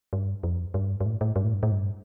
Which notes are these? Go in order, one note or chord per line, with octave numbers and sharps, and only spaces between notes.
G2
F2
G2
G2
A2
A2
G2
A2
G2
A2
G2